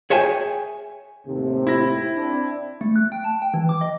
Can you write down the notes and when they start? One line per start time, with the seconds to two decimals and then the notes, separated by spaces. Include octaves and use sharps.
0.10 G#4 C#5 E5 G5 G#5
1.26 D#2 A2 C3
1.67 E4 A#6
2.14 C4 D4
2.81 A3
2.96 F#6
3.12 G5
3.24 A5
3.42 G5
3.54 E3
3.69 D6
3.81 D#5